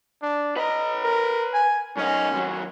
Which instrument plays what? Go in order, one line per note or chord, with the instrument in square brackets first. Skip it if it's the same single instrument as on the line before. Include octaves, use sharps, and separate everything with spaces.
[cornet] D4
[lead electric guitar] B4 A#5 [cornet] D#5
[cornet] A#4
G#5
[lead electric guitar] F#2 D#4 [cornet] C#4
[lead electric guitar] D#2 F#3